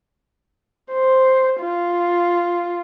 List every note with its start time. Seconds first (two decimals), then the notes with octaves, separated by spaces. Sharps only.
0.92 C5
1.60 F4